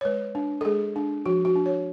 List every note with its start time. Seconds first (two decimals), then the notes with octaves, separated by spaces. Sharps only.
0.01 C#5
0.05 G#3 B4
0.35 D4
0.61 A4
0.65 G#3 G#4
0.96 D4
1.26 F3 F#4
1.45 F#4
1.56 D4
1.66 C#5